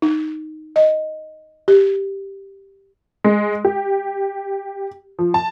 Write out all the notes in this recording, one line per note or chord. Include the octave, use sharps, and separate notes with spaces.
D#4
D#5
G4
G#3
G4
F3
A5